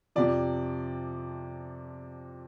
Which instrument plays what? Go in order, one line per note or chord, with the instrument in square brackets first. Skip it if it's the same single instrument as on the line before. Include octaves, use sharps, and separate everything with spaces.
[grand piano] F2 C3 F3 D5